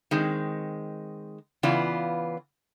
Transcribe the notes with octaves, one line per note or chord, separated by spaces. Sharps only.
D#3 G#3 C4
C#3 E3 B3 F4 D5